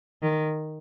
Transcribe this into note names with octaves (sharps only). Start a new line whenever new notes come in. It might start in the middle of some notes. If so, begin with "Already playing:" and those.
D#3